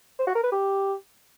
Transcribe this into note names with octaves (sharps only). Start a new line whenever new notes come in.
C5
F#4
A#4
B4
G4